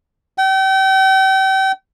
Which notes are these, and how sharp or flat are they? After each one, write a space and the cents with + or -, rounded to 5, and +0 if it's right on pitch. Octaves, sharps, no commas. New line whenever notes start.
G5 -35